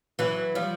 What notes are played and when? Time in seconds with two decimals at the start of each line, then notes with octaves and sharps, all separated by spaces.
0.19 E3 F#3
0.55 F3 G3